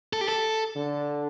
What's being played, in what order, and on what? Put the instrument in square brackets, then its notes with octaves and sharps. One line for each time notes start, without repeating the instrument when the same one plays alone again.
[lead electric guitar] A4
G4
A4
[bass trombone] D3